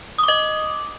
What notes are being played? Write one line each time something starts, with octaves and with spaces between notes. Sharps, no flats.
D#5 D6 D#6